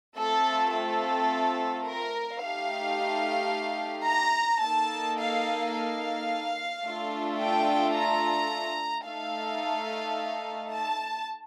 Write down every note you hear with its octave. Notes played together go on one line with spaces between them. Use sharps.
A3 C4 F4 A4
A4
A#4
A3 D#4 G4 F5
A#5
A#3 D#4 A4 A5
F5
F5
A3 D4 F4 A4
G5
A#5
A3 D#4 A4 F5
A5